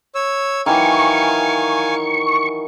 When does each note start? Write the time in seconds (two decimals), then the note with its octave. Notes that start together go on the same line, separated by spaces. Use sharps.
0.15 C#5 E6
0.66 D#3 E3 F#3 F5 G#5 C#6